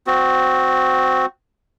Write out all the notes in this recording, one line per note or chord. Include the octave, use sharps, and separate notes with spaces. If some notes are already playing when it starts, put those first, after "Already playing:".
C4 F#4